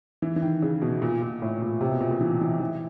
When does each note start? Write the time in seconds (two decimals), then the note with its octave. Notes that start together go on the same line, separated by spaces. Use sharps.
0.22 E3
0.36 E3
0.42 D#3
0.62 C#3
0.82 B2
1.02 A#2
1.22 A#2
1.42 A2
1.62 A#2
1.81 C3
1.91 B2
2.00 A#2
2.11 A#2
2.21 E3
2.41 E3
2.60 E3